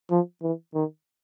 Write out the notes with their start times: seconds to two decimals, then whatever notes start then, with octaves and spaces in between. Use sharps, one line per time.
0.10 F3
0.42 E3
0.74 D#3